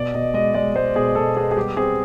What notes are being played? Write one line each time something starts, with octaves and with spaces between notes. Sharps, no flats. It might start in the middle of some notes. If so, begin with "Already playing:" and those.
Already playing: B2 D5
B2 D#5
G#3 D#5
G#3 D5
G#3 C5
B2 G#4
B2 A4
B3 G#4
G#4
G3 G4
C4 G#4